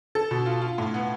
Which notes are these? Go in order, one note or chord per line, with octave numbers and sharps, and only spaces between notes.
A4
B2
F4
F4
A2
B3